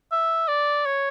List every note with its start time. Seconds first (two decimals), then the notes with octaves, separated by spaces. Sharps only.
0.12 E5
0.48 D5
0.86 C#5